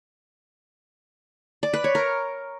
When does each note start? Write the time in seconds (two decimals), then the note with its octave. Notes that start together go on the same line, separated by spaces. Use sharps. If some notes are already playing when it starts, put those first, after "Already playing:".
1.63 D5
1.73 B4
1.84 C#5
1.95 A#4